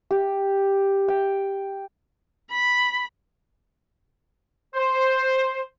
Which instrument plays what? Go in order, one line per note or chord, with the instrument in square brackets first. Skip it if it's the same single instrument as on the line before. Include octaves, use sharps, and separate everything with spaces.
[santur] G4
G5
[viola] B5
[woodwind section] C5